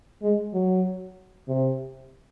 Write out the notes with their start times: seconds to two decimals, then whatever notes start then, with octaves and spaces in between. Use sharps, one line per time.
0.22 G#3
0.54 F#3
1.48 C3